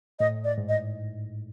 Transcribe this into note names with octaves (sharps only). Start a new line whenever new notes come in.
A2 D#5
D5
G#2
D#5